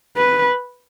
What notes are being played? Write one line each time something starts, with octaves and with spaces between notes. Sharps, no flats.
B4